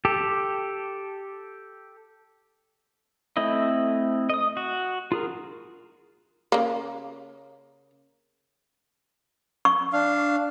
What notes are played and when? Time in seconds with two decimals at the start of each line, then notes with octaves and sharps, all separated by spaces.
0.05 G4 A4
3.37 A3 C4 E4 D#5
4.30 D#5 D#6
4.57 F#4
5.12 F4 G#4 A#4
6.52 C#3 A#3
9.65 C#6
9.93 D4 F5